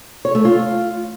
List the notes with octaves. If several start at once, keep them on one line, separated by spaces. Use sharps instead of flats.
C#5
A3
F4